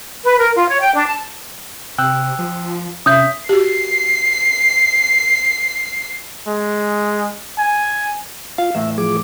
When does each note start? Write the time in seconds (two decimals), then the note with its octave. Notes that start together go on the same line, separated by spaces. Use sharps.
0.24 B4
0.39 A#4
0.55 F4
0.69 C#5
0.80 G5
0.95 D4
1.06 A5
1.98 C3 G5 E6 F#6
2.39 F3
3.06 C3 C#4 E5 D#6 G6
3.49 F#4 G4 C7
6.47 G#3
7.58 G#5
8.58 F4 F5
8.75 E2 A2 E5
8.98 F3 G#4 D6